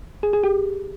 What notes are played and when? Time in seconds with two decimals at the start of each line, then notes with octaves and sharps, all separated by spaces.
0.23 G#4
0.33 G#4
0.44 G4